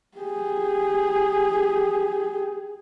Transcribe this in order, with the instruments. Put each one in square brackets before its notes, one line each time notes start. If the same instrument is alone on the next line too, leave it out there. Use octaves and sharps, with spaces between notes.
[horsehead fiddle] G4 G#4